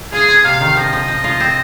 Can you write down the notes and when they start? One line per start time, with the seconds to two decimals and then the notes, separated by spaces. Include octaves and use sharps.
0.12 F4 G#4
0.28 F4
0.44 C3 F5
0.61 D#3
0.77 F3 D#5
0.93 F3
1.08 F3
1.24 F4
1.40 C4